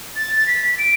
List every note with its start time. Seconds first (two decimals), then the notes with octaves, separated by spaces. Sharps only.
0.16 A6
0.36 A6
0.47 B6
0.79 D7